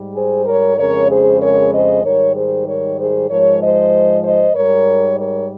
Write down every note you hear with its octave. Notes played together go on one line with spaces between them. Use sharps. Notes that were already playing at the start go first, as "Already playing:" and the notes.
Already playing: G#2 G3
G#4 C5
A#4 C#5
F2 C#3 G#3 A#4 C#5
G#4 C5
A#4 C#5
C5 D#5
G#2 D#3 G3 A#4 C#5
G#4 C5
A#4 C#5
G#4 C5
G#2 F3 G#3 A#4 C#5
C5 D#5
C5 D#5
G#2 G3 A#4 C#5
A#4 C#5